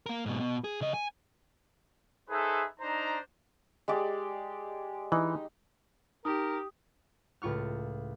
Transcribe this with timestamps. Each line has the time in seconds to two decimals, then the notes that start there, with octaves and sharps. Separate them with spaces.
0.06 A#3 A#4
0.26 G#2 B2
0.40 B2
0.64 G#4
0.81 C#3 D#5
0.94 G#5
2.30 D#4 G#4 A4 B4 C5 E5
2.80 D4 D#4 C5 A#5
3.88 G#3 G4 D5
5.12 E3 D#4
6.25 D#4 G4 A#4 D#6
7.42 C#2 A2 F4 C#6 F6